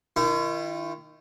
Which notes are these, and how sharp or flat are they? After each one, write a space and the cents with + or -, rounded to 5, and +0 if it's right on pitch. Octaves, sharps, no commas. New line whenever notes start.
D#3 +0 E4 +45